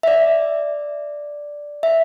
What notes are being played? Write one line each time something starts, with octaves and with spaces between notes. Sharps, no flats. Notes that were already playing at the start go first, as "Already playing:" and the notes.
E5
D5
E5